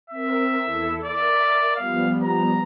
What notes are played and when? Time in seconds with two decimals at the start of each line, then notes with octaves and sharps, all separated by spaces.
0.10 C4 A#4 E5
0.63 E2 E4 A4
1.05 A#4 D5 E5
1.76 F3 G3 B3 F5
2.23 A#5